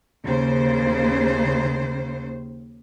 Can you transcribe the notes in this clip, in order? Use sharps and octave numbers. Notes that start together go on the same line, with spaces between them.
D#2 C#3 C5